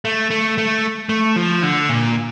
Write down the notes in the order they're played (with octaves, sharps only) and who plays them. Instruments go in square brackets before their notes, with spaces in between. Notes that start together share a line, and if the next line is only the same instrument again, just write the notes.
[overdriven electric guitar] A3
A3
A3
A3
F3
D3
A#2